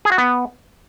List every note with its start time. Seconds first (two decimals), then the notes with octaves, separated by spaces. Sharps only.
0.05 G#4
0.12 F#4
0.18 B3